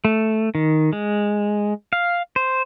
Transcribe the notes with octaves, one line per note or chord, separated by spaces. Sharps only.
A3
D#3
G#3
F5
C5